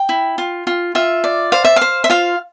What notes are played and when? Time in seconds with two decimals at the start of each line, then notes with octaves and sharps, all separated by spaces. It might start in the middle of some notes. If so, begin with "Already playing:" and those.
Already playing: G5
0.09 E4
0.38 F4
0.67 F4
0.95 F4 E5
1.24 D5
1.52 C5 F5
1.65 E5
1.76 F5
1.81 C5
2.04 E5
2.10 F4 F5